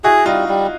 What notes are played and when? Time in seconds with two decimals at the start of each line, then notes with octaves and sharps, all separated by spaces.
0.04 E4 F#4 G#4
0.26 G3 D#4 F4
0.48 G3